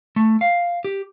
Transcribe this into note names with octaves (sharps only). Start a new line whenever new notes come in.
A3
F5
G4